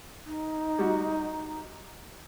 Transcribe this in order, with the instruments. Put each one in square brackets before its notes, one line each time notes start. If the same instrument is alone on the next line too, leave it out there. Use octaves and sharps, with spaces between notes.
[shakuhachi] D#4
[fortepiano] G3 F#4